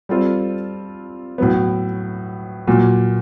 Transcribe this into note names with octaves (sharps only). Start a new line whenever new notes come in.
G3 C4 F4 A4
A2 F#3 B3
A#2 F#3 A#3